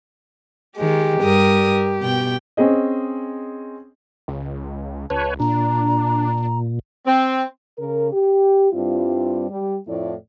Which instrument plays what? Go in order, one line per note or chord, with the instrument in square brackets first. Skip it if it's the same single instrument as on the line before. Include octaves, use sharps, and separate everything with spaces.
[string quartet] D#3 G#3 [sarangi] G4
[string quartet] G2 A#4 D#6
B2 G5
[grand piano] C4 C#4 G#4 D#5
[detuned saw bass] C#2
[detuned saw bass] C#2 [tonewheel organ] B4 C#5 [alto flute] A5
[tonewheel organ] A#2 [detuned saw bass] D4 [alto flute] A#5
[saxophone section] C4
[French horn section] C#3 A#4
G4
G2 G3 C4 E4 F4
G3
F2 A2 F3 A3 E4 D5